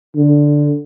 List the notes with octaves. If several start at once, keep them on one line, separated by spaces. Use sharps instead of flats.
D3